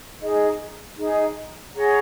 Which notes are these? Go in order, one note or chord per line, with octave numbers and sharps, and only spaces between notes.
D#4 G#4 D#5
D#4 G#4 D#5
G#4 C#5 F#5 A#5